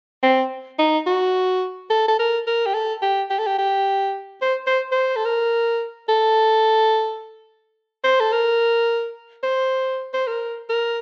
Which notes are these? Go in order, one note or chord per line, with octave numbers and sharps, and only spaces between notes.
C4
D#4
F#4
A4
A4
A#4
A#4
G4
A4
G4
G4
A4
G4
G4
C5
C5
C5
A4
A#4
A4
C5
A4
A#4
C5
C5
A#4
A#4